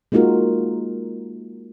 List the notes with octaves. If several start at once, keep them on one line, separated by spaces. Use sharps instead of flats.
G#3 A#3 D#4 F4 F#4 A#4